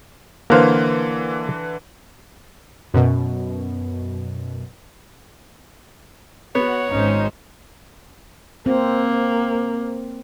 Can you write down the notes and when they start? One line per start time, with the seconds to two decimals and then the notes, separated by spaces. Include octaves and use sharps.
0.50 D3 E3 A#3 C5 F5
2.94 F#2 B2
6.55 B3 F#4 C#5 F#5
6.92 G#1 C#4 D#4 C5
8.66 A#3 C4